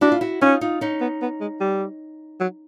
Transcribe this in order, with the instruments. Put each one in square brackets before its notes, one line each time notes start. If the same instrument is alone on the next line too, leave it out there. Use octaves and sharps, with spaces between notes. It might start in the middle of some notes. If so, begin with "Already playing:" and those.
[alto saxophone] D4 [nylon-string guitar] E4 F#4
[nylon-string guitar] F4
E4 F#4
[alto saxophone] C#4 [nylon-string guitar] D#4 F4
[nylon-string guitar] D#4 F4
C#4 D#4
[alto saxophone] B3
B3
G#3
G3
F#3